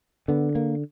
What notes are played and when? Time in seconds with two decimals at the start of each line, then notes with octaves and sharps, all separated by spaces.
0.28 D3 B3
0.55 A#3